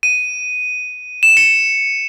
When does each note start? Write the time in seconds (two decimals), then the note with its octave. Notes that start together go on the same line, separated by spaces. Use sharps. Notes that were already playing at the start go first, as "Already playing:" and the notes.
0.03 D#7
1.23 E7
1.37 C#7